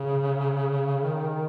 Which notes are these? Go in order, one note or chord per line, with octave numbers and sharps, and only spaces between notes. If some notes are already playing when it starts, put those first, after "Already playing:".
Already playing: C#3
D#3